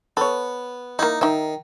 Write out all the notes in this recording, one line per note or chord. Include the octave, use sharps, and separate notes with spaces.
B3 A4 C#5
A#3 D#4 E4
D#3 D#4 E5